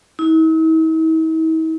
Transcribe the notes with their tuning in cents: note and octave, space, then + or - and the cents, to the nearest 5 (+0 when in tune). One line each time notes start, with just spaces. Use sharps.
E4 -45